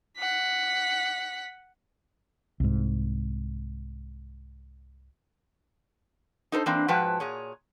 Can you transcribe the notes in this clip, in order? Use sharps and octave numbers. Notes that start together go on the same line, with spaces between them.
F#5 B6
C2 G#2
D#4 A4 A#4 C5
E3 A#3 C4 D4
G#2 F3 F#4 B4 G5 A5
A#2 G#4 C#5